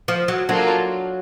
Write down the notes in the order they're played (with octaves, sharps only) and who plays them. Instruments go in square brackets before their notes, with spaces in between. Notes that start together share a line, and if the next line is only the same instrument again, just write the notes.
[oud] F3
F#3
[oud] F#3 [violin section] A#3 D4 F4 A4